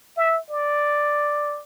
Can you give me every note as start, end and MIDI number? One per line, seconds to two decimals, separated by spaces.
0.17 0.39 76
0.50 1.61 74